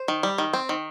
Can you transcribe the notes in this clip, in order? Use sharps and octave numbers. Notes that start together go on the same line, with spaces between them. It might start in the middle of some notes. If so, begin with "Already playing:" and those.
Already playing: C5
D#3
G3
D#3
C4
D#3